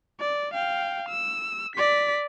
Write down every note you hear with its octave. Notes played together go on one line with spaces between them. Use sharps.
D5
F5 G5
E6
D5 B6